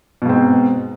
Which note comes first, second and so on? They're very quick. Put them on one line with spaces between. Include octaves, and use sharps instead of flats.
B2 G#2 C4